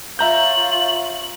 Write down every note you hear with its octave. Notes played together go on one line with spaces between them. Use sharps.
F4 C#5 E5 A#5 G6 F#7